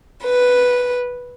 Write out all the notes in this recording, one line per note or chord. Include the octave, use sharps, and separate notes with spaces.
B4